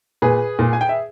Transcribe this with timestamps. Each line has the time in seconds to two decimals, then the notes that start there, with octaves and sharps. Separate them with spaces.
0.22 A#2 G#4 B4
0.59 A#2
0.73 G#5
0.81 G5
0.89 E5